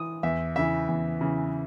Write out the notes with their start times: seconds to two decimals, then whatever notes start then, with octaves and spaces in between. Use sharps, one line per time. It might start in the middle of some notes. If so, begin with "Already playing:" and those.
Already playing: E3 D#6
0.23 E2 E5
0.56 C#3 E3 E5
0.88 E2
1.21 C#3 E3